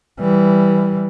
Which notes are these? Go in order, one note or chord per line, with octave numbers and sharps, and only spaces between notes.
E3 G3